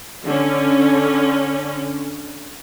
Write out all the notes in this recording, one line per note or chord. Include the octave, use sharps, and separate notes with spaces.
D3 C#4